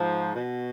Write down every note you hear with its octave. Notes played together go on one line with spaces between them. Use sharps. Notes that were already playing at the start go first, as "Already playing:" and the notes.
Already playing: G#2 F3
B2